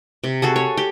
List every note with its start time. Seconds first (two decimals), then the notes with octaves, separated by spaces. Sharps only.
0.24 C3
0.42 F#4 G#4 A4
0.56 C#5
0.77 G4